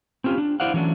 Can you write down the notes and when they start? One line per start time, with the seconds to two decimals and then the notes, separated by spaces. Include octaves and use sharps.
0.24 C4 C#4 F4 G4
0.38 D4
0.60 E4 C5 D5 F5 F#5
0.74 E3 F#3 A3 C#4 D4